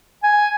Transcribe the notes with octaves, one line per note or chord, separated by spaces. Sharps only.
G#5